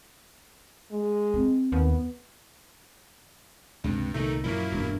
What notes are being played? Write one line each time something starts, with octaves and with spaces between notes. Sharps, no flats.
G#3
C4
D#2 B3
C#2 G2 C3
C2 A#2 D#3 A3 D#4
F#2 A#2 F3 F#3 A#3 E4
E1 G2